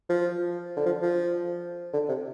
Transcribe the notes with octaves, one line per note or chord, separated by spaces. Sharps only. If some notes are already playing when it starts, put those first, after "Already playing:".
F3
D3
F3
F3
D3
C3